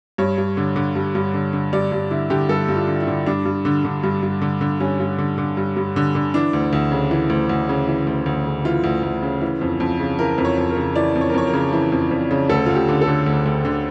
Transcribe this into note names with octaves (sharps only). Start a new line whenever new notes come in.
G2 C#5
G2
D3
D3
G2
G2
D3
D3
G2 D5
G2
D3 E4
D3 G4
G2 A4
G2
F4
D3
E4
D3
G2 D4
G2
D3
D3
G2
G2
D3
D3
G2 C#4
G2
D3
D3
G2
G2
D3
D3
E3 D4
D2
D2
C#3
E3
D2
D2
C#3
E3
D2
D2
C#3
E3 F4
D2
D2
C#3
E3
F2
F2
C#3
E3 A#4
F2
C#5
F2
A#4
C#3
E3 D5
F2
C#5
A#4
F2 C#5
A#4
C#3
E3
F2
F2
C#3
D2 A4
D2 F4
G4
D3
A4
D3
D2
D2
D3